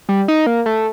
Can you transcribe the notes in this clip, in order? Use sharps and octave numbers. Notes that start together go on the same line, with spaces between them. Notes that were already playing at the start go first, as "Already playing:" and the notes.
G3
D#4
A#3
A3